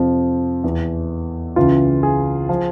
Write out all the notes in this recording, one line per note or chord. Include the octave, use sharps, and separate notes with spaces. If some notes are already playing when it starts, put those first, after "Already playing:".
Already playing: F2 C3 F3
E2 E3
C#2 C#3 E3 F4
G#4
F3